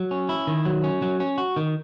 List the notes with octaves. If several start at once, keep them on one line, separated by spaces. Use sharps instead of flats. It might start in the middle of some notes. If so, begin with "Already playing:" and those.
Already playing: F#3
C#4
E4
D#3
F#3
C#4
F#3
C#4
F#4
D#3